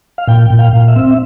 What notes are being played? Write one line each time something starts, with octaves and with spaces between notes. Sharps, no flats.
F5
A#2 G5
A#2
F5
A#2
E5
C4
E5